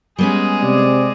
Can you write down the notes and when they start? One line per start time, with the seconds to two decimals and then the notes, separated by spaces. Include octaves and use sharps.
0.18 G3 G#3 B3 C#4 G#4
0.63 C3 C4 D5